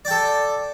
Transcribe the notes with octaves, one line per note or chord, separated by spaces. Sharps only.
A4 D5 G5